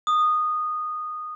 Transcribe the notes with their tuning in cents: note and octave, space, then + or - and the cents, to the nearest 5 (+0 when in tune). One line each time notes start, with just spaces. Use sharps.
D#6 -15